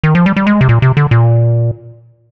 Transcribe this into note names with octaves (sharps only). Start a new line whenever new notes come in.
D#3
F3
G3
G3
G#3
C3
A#2
C3
D3
A#2